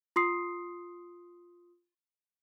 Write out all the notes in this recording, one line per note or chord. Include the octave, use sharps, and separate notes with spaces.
F4 C6 D#6 C7